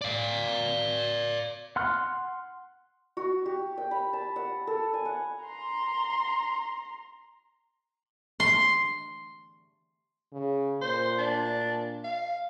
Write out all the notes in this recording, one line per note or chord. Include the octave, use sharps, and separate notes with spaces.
D5 F5
F#5 C6 F6 F#6
F#4
G4
G5
B5
A5
F#5
A4
G#5
F#5
A#5 C6
C6
C#3
A#2 C5
D4
F5